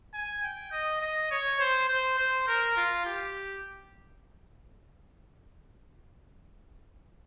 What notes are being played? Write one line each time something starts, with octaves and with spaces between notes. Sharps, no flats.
G#5
G5
D#5
D#5
C#5
C5
C5
C5
A#4
F4
G4